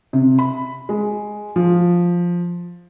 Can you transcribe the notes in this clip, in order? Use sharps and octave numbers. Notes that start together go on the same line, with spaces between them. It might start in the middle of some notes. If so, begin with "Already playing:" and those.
C3
B5
G#3
F3